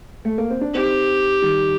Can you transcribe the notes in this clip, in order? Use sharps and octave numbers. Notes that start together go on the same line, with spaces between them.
A3
A#3
C4
D4
C4 D#4 G4
D#3 G3